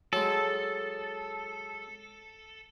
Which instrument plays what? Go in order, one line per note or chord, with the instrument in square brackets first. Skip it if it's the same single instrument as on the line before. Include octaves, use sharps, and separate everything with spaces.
[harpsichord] F#3 G#3 [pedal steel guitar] A4